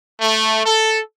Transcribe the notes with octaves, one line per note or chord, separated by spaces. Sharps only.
A3
A4